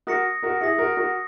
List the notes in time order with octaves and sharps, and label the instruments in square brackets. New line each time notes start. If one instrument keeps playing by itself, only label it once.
[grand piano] F#4 A#4 [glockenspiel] D#6 A#6 C#7
[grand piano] F#4 A#4
[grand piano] E4 G#4 [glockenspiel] D#6 A#6 C#7
[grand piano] F#4 A#4
F#4 A#4